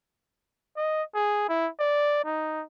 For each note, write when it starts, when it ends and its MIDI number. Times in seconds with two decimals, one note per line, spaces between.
0.77 1.03 75
1.15 1.45 68
1.49 1.68 64
1.79 2.21 74
2.24 2.63 63